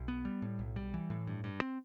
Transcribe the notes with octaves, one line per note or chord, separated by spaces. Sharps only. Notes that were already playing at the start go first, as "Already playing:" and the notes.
Already playing: B1
B3
G3
A2
B1
G3
E3
A2
G2
G2
C4